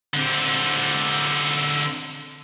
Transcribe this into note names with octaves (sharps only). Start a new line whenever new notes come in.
D3 C4